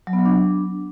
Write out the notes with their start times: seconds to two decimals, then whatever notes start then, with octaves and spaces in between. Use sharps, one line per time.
0.07 F#3
0.13 B3
0.19 F#3
0.25 D4